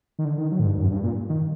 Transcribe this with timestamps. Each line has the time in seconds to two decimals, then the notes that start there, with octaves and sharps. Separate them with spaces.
0.19 D#3
0.25 D3
0.38 D#3
0.52 F#3
0.60 A2
0.65 G2
0.78 F#2
0.91 G2
1.03 A#2
1.29 D#3